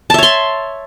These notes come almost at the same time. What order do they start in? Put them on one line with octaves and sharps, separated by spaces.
A5 E5 C#5 C6